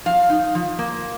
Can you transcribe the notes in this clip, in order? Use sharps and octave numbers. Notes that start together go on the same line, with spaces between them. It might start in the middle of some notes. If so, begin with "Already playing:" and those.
F3 F5
D#4
F3
A#3